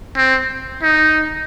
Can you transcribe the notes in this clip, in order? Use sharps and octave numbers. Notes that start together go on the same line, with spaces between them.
C4
D#4